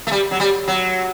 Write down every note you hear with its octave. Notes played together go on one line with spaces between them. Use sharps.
A3
G3
F#3
G3
F#3